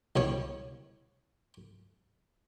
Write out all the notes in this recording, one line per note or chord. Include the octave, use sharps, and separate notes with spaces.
C2 B2 C#5